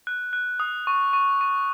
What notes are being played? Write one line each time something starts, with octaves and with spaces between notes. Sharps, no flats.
F#6
F#6
D#6
C#6
C#6
C#6